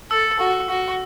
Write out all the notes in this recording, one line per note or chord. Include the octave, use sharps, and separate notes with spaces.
A4 E6
F#4
F#4